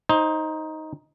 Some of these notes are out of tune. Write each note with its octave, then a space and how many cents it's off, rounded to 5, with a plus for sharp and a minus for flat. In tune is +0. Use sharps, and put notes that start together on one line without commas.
D#4 +10 C5 +20